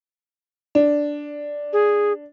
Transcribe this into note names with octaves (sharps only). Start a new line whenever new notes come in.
D4
G#4